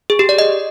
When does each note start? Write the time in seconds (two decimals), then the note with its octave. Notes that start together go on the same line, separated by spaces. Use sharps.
0.10 G#4
0.19 G4
0.29 D5
0.39 D#5